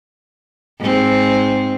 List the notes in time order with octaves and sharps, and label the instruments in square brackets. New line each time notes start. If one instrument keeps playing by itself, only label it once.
[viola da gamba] G#2 C4